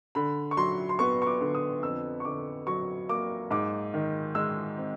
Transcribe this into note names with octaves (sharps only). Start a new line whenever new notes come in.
D3 B5
C#6
F#3 C6
C6
B3 C#6
C#6
D6
D3
D#6
F2 E6
C#6
D3 D6
F#3 C#6
A#3 D6
G#2 D6
D#3
G#3 E6
C4